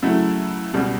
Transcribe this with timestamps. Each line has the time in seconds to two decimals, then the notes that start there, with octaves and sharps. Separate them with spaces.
0.02 C#3 F#3 A3 E4
0.74 C#2 B2 G3